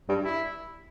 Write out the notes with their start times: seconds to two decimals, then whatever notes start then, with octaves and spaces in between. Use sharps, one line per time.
0.09 G2
0.23 E4